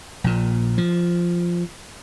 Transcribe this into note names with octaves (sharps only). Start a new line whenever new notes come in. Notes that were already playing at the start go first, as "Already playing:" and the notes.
A#1 A#2
F3